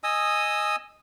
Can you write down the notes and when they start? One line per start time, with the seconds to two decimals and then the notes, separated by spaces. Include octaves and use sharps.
0.04 D#5 G#5 D#6 E6